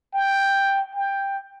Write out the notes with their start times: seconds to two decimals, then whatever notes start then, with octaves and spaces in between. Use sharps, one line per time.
0.14 G5
0.94 G5